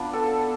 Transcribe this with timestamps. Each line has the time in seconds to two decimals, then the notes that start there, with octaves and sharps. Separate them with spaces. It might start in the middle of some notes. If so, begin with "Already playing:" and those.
Already playing: B3 D4 F4 B4 B5
0.13 A4 A5